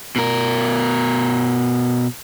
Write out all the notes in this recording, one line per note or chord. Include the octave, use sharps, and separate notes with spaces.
B2 A#4